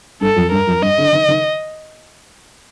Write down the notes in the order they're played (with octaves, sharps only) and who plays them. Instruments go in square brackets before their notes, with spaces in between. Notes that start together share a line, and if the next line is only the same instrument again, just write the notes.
[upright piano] G2 [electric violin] A4
[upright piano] F2
[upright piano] G2 [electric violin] A#4
[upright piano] F2
[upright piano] G2 [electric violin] D#5
[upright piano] D3
D#3
D#3